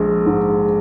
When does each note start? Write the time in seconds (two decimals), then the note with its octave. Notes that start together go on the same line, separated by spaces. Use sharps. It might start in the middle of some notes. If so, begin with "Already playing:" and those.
Already playing: A#1 G#3
0.26 G#2